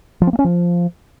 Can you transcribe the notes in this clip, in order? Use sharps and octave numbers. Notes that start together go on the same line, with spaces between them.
F3
C4
A#3
C#4
F3